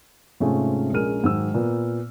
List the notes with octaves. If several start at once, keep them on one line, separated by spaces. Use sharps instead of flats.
G#2 C3 G#3 A3 C#4 F4
A#1 G#3 C#4 A#4 F6 D#7
G#2 D#3 F#3 E6
A#2 A#3 B3